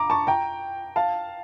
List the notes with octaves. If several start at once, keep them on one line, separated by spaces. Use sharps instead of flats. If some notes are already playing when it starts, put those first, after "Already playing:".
Already playing: A#5 D6
A5 C#6
G5 A#5
F5 A5